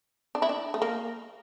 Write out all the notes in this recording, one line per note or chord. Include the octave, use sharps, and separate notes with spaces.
D4
E4
D4
A3
A#3